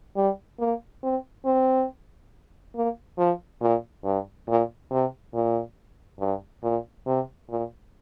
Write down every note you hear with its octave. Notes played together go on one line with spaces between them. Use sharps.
G3
A#3
C4
C4
A#3
F3
A#2
G2
A#2
C3
A#2
G2
A#2
C3
A#2